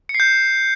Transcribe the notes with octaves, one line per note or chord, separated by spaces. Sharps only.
C#7
C7
G6